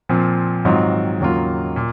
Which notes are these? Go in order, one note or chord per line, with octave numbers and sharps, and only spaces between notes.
A#2 F3 C4
G#2 D#3 F#3 C4 F4
D#2 C#3 F#3 A#3 F4
A#2